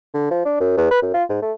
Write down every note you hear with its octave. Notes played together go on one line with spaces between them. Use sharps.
D3
F3
D4
F#2
E2
B4
F#2
F4
G#2
A3